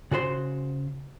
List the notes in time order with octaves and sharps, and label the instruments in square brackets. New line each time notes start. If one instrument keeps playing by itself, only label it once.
[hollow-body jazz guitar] C#3 F#4 C5 C6